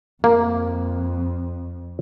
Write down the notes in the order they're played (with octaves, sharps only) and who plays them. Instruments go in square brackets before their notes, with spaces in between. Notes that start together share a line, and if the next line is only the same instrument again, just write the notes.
[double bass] F2 [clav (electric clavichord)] A#3